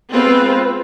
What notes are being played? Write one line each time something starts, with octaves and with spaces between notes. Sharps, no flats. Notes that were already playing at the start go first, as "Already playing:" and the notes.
G#3 B3 C4 F4 B4 C5